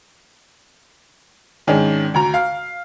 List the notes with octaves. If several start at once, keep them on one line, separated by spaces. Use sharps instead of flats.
G#2 D#3 C#4 D4
D2 A#5
F5